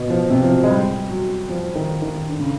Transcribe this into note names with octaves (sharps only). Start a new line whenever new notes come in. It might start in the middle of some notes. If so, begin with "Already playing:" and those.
Already playing: B2
F3
C3
F3
F#3
G#3
G3
F#3
F3
D#3
D#3
D3
C#3